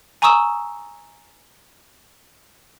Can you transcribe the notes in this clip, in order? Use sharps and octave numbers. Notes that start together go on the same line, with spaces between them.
G#5 A#5 C#6 D#6 E6 E7